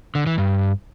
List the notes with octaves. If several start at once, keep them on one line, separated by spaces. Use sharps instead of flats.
D3
E3
G2